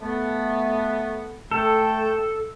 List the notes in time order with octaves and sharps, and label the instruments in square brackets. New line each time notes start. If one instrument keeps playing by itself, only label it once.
[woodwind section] A3 B3
[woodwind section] A3 G5 [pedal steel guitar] A4